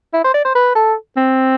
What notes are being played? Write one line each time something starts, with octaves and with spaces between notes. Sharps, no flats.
E4
C5
D5
C5
B4
A4
C4